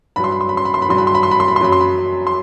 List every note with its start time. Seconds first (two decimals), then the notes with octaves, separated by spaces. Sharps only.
0.16 G2 F#3 B5
0.24 C6
0.32 B5
0.41 C6
0.49 B5
0.57 C6
0.65 B5
0.74 C6
0.82 B5
0.89 G2 F#3 C6
0.98 B5
1.07 C6
1.15 B5
1.23 C6
1.31 B5
1.40 C6
1.48 B5
1.56 C6
1.61 F#2 F#3 B5
1.72 C6
1.80 B5
2.27 C6